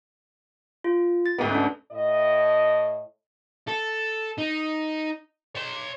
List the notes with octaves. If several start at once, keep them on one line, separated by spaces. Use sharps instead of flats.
F4
A6
D2 G#2 B3
C#4 D4
A2 D#5
A4
D#4
C#5 C6